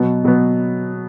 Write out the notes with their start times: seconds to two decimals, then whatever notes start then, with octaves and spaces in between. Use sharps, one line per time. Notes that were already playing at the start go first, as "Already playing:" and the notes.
Already playing: B2 F#3 B3
0.24 B2 F#3 B3